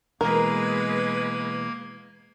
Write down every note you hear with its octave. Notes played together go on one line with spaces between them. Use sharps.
B2 E3 G#3 A#3 A#4 B4 G#6